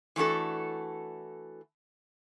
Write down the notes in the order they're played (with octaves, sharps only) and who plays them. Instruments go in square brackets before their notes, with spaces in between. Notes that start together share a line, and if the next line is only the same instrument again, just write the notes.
[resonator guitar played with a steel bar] E3 A3 D4 F#4 A4